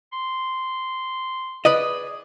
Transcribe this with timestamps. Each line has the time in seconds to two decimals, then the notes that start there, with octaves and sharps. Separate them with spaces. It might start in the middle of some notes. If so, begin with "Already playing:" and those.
0.12 C6
1.65 G#4 B4 D5 D#5